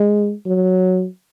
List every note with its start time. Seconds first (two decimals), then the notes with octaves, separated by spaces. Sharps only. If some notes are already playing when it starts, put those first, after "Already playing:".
Already playing: G#3
0.46 F#3